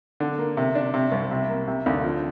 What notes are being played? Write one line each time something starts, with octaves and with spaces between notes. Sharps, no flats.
D3
A#3
C3
D4
C3
C2
C3
A#3
C3
D2
F3